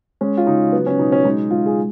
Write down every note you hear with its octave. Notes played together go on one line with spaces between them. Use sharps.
G#3 C#4
F4
C#3 D#4
F#3 B3
C#4
B2 D#4
C#4
G#3 D#4
G#3 F4
G#4